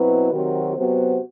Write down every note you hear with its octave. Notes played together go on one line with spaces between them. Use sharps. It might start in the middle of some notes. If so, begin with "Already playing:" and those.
Already playing: B2 F#3 C4 E4 B4
C3 D#3 F#3 C4 F#4
C3 F#3 B3 F#4 C5